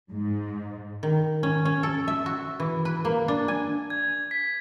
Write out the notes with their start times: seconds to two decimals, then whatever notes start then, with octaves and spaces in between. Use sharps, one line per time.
0.12 G#2
1.03 D#3
1.43 C#4
1.65 C#4
1.83 A4
2.08 E5
2.26 F#4
2.60 E3
2.85 B4
3.05 A#3
3.28 D4
3.48 G#5
3.90 G#6
4.31 B6